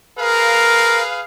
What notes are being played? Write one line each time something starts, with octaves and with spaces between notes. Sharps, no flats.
G#4 A#4 B4 F5